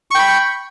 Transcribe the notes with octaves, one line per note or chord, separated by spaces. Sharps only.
G5 B5 C#6